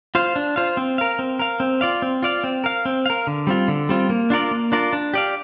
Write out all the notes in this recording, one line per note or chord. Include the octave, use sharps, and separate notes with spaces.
F4 C5 F5
D4
F4 C5 F5
C4
A#4 F5
C4
A#4 F5
C4
F4 D5 F5
C4
F4 D5 F5
C4
A#4 F5
C4
A#4 F5
D3
G3 C4 F4
D3
G3 C4 F4
A#3
D4 F4 A#4 D5
A#3
D4 F4 A#4 D5
D4
G4 D5 F5